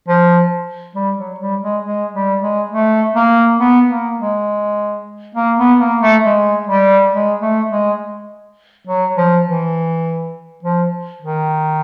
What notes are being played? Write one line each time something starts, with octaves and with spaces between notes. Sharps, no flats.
F3
G3
F#3
G3
G#3
G#3
G3
G#3
A3
A#3
B3
A#3
G#3
A#3
B3
A#3
A3
G#3
G3
G#3
A3
G#3
F#3
F3
E3
F3
D#3